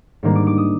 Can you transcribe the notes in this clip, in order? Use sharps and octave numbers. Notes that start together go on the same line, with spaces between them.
G#2 D#3 G3 A#3 D4
D6
D6
D#6